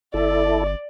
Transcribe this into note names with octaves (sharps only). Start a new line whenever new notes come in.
G1 E4 A4 D5